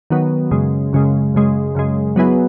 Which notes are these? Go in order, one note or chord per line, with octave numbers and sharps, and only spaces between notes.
D#3 F#3 B3
F#2 C#3 G#3
F#2 C#3 G#3
F#2 C#3 G#3
F#2 C#3 G#3
F#3 B3 E4 G#4 B4